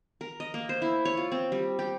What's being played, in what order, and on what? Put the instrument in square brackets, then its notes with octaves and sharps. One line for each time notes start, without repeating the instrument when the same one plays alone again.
[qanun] A#4
D#5
A#3
C5
E4
C#5
F4
C4
G3
G4